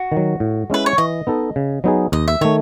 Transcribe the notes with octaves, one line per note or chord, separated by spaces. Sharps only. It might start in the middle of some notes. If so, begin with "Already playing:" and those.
Already playing: F#4
D#3
F#3
A2
G#3 C#4 E4 B4
C#5
E3 D#5
B3 D#4 A4
C#3
F#3 B3 D#4 G#4
D#2 D#5
E5
D#3 A3 C#5